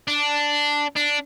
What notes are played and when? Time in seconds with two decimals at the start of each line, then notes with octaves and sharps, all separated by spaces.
0.08 D4
0.96 D4